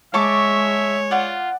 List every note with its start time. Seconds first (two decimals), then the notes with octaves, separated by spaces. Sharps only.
0.14 G#3 C#5 E5 A5 C#6 D6
1.11 F4 D5 F#5